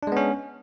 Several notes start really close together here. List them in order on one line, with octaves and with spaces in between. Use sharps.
D4 G#3 B3 C#4